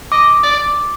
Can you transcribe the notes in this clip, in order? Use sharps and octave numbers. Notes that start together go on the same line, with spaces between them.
D#5 D6
D5